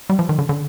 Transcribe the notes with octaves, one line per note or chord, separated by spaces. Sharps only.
G3
F3
D#3
D3
D3